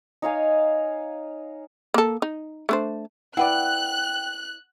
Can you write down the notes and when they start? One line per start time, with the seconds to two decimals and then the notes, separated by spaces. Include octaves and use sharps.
0.22 D#4 C#5 F5 G#5
1.94 A#3 A4
2.22 D#4
2.69 A3 D4 C5
3.37 E4 B4 D5 F#5 G5 F#6